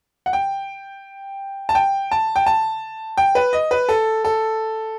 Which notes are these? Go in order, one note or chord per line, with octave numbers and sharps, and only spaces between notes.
F#5
G5
A5
G5
A5
G5
A5
G5
B4
D#5
B4
A4
A4